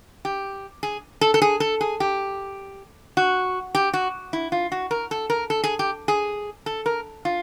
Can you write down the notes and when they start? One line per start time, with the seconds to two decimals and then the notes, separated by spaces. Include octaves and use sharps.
0.25 G4
0.83 G#4
1.21 A4
1.34 A4
1.42 G#4
1.60 A4
1.81 G#4
2.00 G4
3.17 F#4
3.75 G4
3.93 F#4
4.33 E4
4.52 F4
4.72 F#4
4.91 A#4
5.11 A4
5.30 A#4
5.50 A4
5.64 G#4
5.79 G4
6.08 G#4
6.66 A4
6.86 A#4
7.25 F4